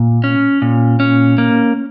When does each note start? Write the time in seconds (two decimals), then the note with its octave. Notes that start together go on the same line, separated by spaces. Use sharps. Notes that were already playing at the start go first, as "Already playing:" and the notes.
Already playing: A#2
0.24 C#4
0.62 A#2
1.00 C#4
1.38 A#3